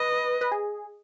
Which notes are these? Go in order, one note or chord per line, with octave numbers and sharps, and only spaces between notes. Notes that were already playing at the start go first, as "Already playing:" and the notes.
Already playing: B4 D#5
B4
G#4